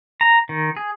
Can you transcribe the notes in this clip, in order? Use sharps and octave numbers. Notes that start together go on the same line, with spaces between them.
A#5
D#3
G#4